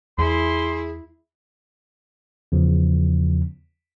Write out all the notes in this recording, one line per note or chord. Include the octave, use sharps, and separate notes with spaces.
E2 E4 G#4 C6
E2 C#3 F3